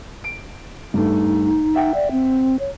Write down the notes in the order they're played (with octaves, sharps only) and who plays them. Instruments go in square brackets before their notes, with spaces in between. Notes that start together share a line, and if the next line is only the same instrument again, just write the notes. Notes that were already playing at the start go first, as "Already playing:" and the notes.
[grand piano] D7
[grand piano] G2 A3 [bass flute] D#4
[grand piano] E5 F#5 G5
[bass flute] D5
C4
C#5